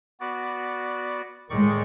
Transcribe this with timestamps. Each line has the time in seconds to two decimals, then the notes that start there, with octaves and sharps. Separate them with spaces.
0.20 B3 F#4 D5
1.50 A2 D#3 G#3 D5 C#6